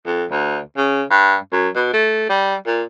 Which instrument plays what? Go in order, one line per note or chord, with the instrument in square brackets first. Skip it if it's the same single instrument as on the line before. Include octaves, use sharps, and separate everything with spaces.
[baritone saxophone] F2
D2
C#3
G2
F#2
B2
A3
G3
A#2